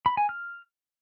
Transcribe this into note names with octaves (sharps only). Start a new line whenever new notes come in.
B5
G#5
F6